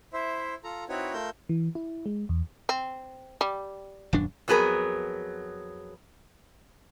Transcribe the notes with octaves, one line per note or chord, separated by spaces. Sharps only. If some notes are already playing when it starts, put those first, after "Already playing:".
E4 C5 E5
F4 A4 A#5
C4 D#4 E4 F#4 B4 C#5
A3 F4 A#4 E6 G6
E3
E4
G#3
E2
C4
G3
D#1 F#2 D4
F2 F#3 B3 G#4 A#4